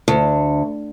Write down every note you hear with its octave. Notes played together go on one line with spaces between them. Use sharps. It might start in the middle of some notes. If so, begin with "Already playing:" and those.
D2